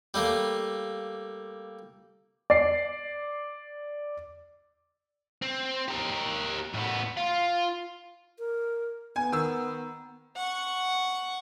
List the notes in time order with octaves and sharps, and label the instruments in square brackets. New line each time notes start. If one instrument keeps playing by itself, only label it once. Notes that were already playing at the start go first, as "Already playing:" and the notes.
[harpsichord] G3 A3 A#3
[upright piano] D5 C7
[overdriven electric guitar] C4
G4 A#4
A2 B3
F4
[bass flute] A#4
[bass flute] B3 [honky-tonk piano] G#5
[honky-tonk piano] D#3 E6
[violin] F#5 C#6